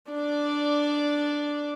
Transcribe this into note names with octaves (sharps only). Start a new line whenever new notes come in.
D4 D5